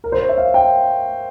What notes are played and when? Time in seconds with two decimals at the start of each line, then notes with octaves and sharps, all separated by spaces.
0.04 A#4
0.12 C5
0.21 C#5
0.29 E5
0.38 F5
0.54 G5